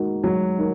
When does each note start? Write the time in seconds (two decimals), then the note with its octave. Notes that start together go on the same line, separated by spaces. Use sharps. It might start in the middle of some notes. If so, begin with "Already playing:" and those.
Already playing: G#3 D#4 F#4 A#4
0.24 F#3 G#3
0.58 D#4 F#4 A#4